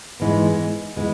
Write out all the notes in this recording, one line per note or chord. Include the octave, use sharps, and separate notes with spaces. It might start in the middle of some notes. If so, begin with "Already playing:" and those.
G#2 E3 G#3 B3
E3 G#3 B3